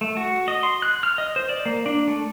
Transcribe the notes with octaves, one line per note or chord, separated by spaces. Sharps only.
A3
F#4
D#5
C6
F#6
F6
D#5
C5
D5
A#3
D4
A3